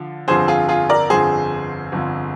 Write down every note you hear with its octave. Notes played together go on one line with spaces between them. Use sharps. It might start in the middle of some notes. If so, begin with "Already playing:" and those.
Already playing: D3 F3
G1 F2 D3 F3 G#4 C5
F4 G#4
F4 G#4
A#4 D5
G1 F2 D3 F3 G#4 C5
G1 F2 D3 F3